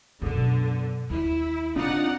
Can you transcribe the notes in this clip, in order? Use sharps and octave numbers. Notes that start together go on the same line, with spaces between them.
F#2 B2 D3
D#2 E4
C#3 A#3 C4 D4 D#4 F4 D5 F#5